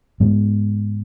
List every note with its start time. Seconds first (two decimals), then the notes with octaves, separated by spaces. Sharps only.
0.20 G#2 G#3 B3